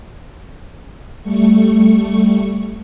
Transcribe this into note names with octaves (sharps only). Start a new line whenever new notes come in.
G3 A3 C#6